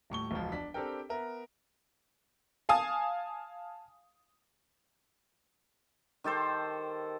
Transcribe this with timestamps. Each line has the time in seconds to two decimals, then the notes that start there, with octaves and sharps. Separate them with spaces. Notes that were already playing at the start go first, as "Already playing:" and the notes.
0.10 D#1 A2 C#6 G7
0.31 E1 C#2 F3
0.52 D4 B6
0.74 C4 D4 G4 A4 A#4 G5
1.09 B3 A#4 E5
2.69 F5 G#5 A5 D#6
6.24 D#3 G4 A4 C5